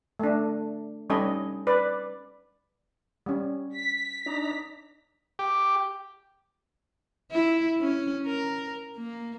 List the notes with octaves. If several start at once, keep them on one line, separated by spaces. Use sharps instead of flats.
A3 D4
G3 C#4 D#4 A4 D#5 B5
B4 D5
G3 C#4
B6
D4 D#4 A#5
G4
E4
C#4
A#4
A#3